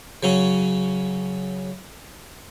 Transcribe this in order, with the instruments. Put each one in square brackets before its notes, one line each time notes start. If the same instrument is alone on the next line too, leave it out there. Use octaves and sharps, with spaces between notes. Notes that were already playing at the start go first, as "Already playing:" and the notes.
[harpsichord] C#3 F#3 C#4